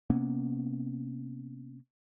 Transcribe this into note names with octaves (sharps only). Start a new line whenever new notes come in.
C3 A#3 B3 C#4